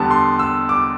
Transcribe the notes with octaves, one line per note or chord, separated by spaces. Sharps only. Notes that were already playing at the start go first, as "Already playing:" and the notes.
Already playing: E2 D3 G3 B3 A5
C6
E6
D6